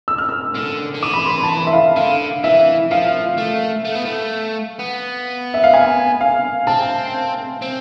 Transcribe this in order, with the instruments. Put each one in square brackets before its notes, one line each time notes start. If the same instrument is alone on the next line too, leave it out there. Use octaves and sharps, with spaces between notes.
[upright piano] E6
F6
E6
[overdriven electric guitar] D3
D3
[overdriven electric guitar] E3 [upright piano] D6
[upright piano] B5
C6
A5
B5
E5
F5
[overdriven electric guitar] D3 [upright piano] F5
[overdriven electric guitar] E3 [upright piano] E5
[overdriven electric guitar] F3 [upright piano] F5
[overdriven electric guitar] A3
A3
B3
A3
B3
[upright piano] E5
F5
G#5
F5
[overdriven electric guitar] C4 [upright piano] A5
[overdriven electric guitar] C4